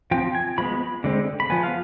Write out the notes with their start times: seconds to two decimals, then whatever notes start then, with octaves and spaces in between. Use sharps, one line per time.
0.11 F3 C4 G5
0.35 G#5
0.58 F3 G#3 B3 B5
1.04 D3 G#3 C4
1.40 B5
1.50 F3 B3 G#5
1.63 F5